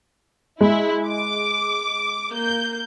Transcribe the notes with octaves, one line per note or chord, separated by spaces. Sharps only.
G#3 E4
D6
A#3 G6